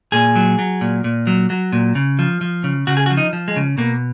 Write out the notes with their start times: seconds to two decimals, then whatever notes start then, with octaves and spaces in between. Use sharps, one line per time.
0.12 A#2 G#4
0.36 F#3
0.59 F#3
0.81 A#2
1.04 A#2
1.27 F#3
1.50 F#3
1.72 A#2
1.95 C#3
2.19 F3
2.41 F3
2.64 C#3
2.87 C#3 F#4
2.97 G#4
3.06 F#4
3.10 F3
3.17 D#4
3.33 F3
3.48 G#3
3.56 C#3
3.78 B2 A#3